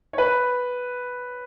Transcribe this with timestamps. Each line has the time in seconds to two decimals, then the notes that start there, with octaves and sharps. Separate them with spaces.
0.13 C#5
0.18 B4